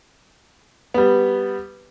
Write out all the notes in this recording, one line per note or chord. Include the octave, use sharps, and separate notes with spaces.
G3 B3